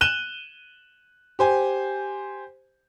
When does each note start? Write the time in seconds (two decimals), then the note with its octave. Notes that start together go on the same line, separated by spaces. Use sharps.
0.01 F#6 D#7 E7 G7
1.39 G4 C5 G#5